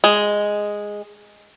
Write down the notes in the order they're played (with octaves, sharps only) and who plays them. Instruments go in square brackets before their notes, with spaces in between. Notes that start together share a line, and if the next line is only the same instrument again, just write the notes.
[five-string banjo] G#3